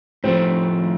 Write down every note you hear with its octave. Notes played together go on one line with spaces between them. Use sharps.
A2 F3 A3 C4